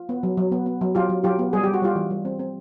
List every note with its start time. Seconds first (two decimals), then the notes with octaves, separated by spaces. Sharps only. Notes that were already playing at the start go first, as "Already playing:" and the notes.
Already playing: F4
0.09 B3
0.23 F#3
0.37 F#3
0.52 B3
0.66 B3
0.81 F#3
0.95 F#3 F4 G4
1.10 F#3
1.24 F#3 F4 G4
1.39 B3
1.53 G3 G#4
1.63 G3 G4
1.74 F#4
1.82 G3 F4 G4
1.95 E3
2.10 G3
2.25 C4
2.39 C4